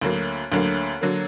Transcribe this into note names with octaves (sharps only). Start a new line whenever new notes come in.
D2 D3 F#3 A#3
D2 D3 F#3 A#3
D3 F#3 A#3